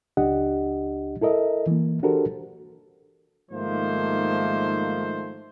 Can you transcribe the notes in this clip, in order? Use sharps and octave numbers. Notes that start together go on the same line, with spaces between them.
C#2 D4 G4 D#5 F#5
E4 A4 A#4 D#5 E5
E3 A#3
D4 F#4 G4 A4 A#4 C5
G#2 D#3 F3 A3 A#3 C5